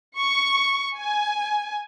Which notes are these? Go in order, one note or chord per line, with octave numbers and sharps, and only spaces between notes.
C#6
G#5